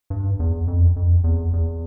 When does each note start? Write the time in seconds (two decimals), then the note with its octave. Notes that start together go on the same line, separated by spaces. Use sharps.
0.10 G2
0.40 E2
0.68 F2
0.96 F2
1.24 E2
1.53 E2